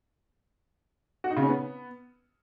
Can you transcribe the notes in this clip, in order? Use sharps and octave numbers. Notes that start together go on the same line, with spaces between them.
F#4
D#4
C#3
C#4
B3